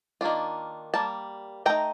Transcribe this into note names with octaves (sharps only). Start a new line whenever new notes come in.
D#3 A#3 D4 F4
G3 A#3 A5
A3 D#4 G5 A#5